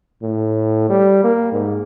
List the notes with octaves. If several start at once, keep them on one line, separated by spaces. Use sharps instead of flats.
A2
G3
A#3
G#2